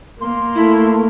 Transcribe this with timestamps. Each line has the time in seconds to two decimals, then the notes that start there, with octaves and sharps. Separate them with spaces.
0.21 A#3 C6
0.55 A3 E4